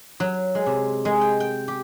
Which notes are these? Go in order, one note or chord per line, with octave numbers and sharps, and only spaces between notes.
F#3
G#3
C3
G#3
G5
G5
G4